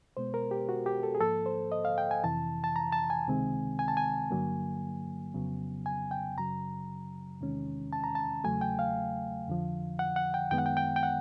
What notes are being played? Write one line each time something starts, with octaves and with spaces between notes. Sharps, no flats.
B2 G#3 B3 C5
A#4
G4
F#4
G4
A4
G#4
G#2 F3 A#3 A4
C5
D#5
F5
G5
G#5
F2 C3 E3 A5
A5
A#5
A5
G#5
C#2 C3 D#3 G#3 C4
G#5
A5
G#5
G2 D3 F#3 A#3
F2 C#3 F#3 B3
G#5
G5
F#2 C#3 F#3 A#5
E2 C3 D#3 G#3 C#4
A5
A#5
A5
E2 C#3 F#3 A3 G#5
G5
F5
F2 D3 F3
F#5
F#5
G5
F#2 D#3 G#3 B3 G5
F#5
G5
G5
G5
F#5